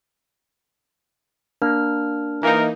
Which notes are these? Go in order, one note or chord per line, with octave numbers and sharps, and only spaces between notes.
A#3 D4 F6
E3 A#3 D#4 A#4